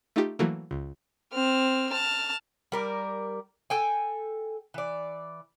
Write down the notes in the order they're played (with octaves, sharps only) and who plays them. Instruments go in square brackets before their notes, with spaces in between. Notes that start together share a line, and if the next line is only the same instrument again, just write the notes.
[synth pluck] A3 D#4 F4 G4
E3 F#3 A3 A#3
C#2
[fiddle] C4 F6
A5 F6
[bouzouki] G3 A#4 D5
A4 G5 G#5
E3 D5